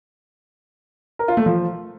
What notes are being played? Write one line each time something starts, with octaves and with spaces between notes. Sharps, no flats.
A#4
F4
A3
F3